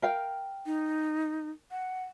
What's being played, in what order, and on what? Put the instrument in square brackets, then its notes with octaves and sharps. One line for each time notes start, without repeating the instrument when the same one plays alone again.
[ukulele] A#4 F5 G5
[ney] D#4
F#5